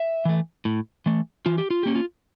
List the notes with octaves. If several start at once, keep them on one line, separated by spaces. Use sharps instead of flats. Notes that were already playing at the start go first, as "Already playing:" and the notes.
Already playing: E5
E3 A3
A2
E3 A3
E3 F4
G4
F4
A#3 C#4 G4
F4